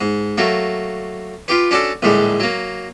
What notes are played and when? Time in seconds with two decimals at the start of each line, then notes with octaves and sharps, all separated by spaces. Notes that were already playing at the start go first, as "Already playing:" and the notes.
0.01 G#2
0.38 F#3 A3 A#3
1.48 F4 G4 B4
1.71 C#4 D4 F#4 A4
2.02 A#1 A2 D3 G3 G#3
2.40 F#3 A#3